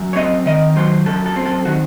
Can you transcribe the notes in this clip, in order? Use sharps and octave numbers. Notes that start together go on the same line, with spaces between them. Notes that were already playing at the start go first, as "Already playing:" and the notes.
Already playing: F#2
C#5
C4 D#5
D#3 D#5
F#3 C5
F#2 A4
A4
C4
A4
D#3 F#4